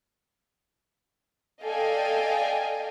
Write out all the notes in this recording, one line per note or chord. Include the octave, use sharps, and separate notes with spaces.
A4 D5 D#5 F5 G5 G#5